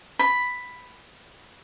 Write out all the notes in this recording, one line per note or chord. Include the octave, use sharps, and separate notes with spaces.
B5